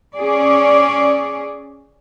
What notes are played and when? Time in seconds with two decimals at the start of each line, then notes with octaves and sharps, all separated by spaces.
0.16 C#4 G#4 D5